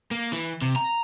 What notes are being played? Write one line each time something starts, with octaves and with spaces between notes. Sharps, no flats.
A#3
E3
C3
A#5